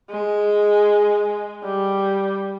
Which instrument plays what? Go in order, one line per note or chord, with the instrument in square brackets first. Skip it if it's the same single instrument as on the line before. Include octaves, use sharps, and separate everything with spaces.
[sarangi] G#3
G3